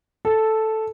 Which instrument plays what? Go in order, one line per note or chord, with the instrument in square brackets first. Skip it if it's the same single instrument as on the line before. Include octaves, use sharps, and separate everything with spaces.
[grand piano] A4